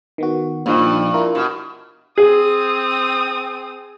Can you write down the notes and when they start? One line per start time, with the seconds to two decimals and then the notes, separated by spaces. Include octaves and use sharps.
0.18 D#3 B3 F#4
0.66 G2 A#2 F3 D#4
1.14 E4 F4 A#4
1.35 B2
2.18 C4 G#4 D#6